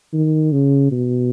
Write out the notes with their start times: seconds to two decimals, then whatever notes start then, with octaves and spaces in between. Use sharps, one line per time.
0.13 D#3
0.52 C#3
0.92 B2